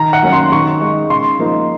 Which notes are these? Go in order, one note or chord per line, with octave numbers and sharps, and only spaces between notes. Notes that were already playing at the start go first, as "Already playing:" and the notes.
Already playing: D#3 A#5
F#5
F#3 A#3 C#4
C6
D#3 C#6
G#3 D#4
C#3 C6
F3 A#3 D#4